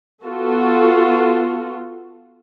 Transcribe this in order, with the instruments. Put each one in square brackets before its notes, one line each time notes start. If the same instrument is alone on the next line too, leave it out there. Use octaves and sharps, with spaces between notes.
[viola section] B3 F4 F#4 A4